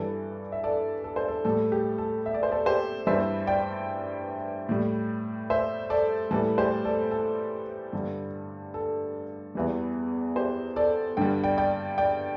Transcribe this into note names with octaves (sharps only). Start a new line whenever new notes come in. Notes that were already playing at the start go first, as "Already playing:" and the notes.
Already playing: G2 E3 G3 A4 D5
E5
A4 D5
A4
C5
A4
A2 G3 A4
G4
A4
E5
D5
C5
A4 D5
G4 C5
G2 E3 G3 C5 E5
D5 G5
A2 G3
C5 E5
A4 D5
A2 E3 G3 A4
G4 C5
A4 D5
A4
G2 D3 G3
A4
E2 E3 G3
G4 C5
A4 D5
G2 D3 G3 G5
D5 G5
D5 G5
D5 G5